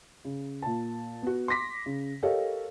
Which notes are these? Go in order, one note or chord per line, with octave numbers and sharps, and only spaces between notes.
C#3
A#2 A5
B3 F#4
C6 D6 A#6 B6
C#3
G4 A4 A#4 C#5 D#5 F5